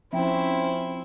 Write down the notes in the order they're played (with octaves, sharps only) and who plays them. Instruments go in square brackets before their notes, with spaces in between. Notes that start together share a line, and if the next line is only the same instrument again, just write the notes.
[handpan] F3 C4 [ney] C#4 [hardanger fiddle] E4 C5 [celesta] E5 G5